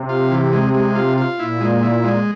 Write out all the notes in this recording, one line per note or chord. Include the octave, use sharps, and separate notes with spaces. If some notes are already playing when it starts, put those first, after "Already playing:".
Already playing: C3
F4
E3
G#3
G#3
F4
F4
A#2 E4
G#3
E4
G#3